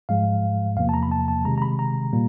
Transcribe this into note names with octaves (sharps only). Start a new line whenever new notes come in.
G#2 F3 G#3 F5
E2 C3 F3 A#3 F5
A5
A#5
B5
A5
A5
C3 D#3 G#3 A#5
A#5
B5
A#5
A#2 G3 A#3